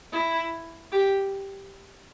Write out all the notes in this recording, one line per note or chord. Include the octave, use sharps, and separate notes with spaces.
E4
G4